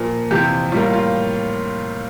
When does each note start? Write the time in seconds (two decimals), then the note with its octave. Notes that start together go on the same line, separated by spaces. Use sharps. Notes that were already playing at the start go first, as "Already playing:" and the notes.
Already playing: A#2 F3 A#3
0.31 F2 C3 E3 G4
0.72 A2 G3 A#3 F4
0.93 F4